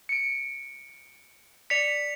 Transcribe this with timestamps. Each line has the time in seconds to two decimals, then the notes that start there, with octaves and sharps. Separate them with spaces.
0.09 C#7 D7
1.70 D5 B6 C#7 F7